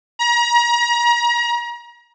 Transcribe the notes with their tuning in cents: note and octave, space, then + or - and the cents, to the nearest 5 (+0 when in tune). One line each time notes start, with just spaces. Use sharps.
A#5 +35